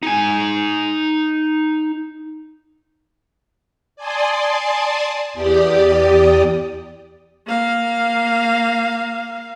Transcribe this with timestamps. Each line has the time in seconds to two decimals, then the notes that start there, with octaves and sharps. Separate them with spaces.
0.03 D#4 G#5
3.96 D5 G#5 A5 C6 D#6
5.33 E2 G4 D5 D#6
7.47 A#3 F5